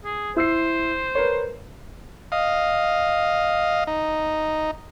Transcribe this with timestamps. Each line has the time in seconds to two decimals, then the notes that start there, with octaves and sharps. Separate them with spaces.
0.05 G#4
0.36 E4 C5 E6 C7
1.15 A#4 B4 C#5
2.32 D#5 F5
3.87 D#4